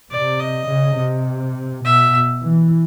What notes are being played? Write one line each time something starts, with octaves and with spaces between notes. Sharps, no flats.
C3 D5
D#5
C#3
C3
B2 E5
E3